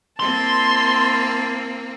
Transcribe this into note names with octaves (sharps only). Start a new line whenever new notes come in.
A#3 C4 E4 A5 C6